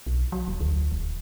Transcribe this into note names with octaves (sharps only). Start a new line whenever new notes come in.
B1
F#3
E1
D2
D#1